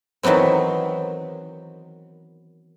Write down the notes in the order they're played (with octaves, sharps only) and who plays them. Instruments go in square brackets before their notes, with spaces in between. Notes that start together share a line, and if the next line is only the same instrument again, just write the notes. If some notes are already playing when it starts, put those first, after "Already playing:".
[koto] D#3 E3 F#3 B3 C4